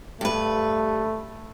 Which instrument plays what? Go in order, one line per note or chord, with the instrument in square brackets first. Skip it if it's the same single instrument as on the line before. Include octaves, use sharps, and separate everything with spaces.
[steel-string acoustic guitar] G2 B4 [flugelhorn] A3